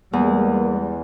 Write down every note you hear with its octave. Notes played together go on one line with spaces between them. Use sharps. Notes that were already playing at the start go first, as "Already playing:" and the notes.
E2 G3 G#3 A#3